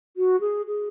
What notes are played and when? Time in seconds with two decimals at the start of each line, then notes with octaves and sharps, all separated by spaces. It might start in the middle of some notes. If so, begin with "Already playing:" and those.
0.17 F#4
0.41 G#4
0.66 G#4